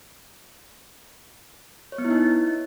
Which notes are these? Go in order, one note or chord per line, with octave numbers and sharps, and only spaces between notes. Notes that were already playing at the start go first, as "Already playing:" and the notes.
C#5
B3
E4
D#4